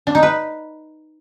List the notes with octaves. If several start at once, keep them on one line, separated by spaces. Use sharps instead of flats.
D4
D#4
B4